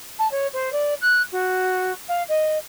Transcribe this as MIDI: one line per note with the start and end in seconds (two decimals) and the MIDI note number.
0.19 0.30 81
0.31 0.47 73
0.53 0.72 72
0.72 0.94 74
1.01 1.22 90
1.32 1.92 66
2.08 2.22 77
2.29 2.58 75